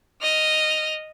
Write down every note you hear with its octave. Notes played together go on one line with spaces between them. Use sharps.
D#5 F6